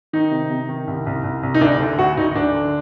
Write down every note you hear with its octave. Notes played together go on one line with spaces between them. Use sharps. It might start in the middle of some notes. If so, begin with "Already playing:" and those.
D#3 D#4
C3
C3
D#3
C2
C2
C2
C2
D#4
D2 D4
D3
D2 F#4
D2 D#4
D2 D4
D3